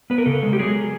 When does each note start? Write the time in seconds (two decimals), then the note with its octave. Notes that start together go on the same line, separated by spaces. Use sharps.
0.10 B3 B4
0.18 A#4
0.26 C#3 A4
0.43 G#3
0.53 G4
0.59 F#3 G#4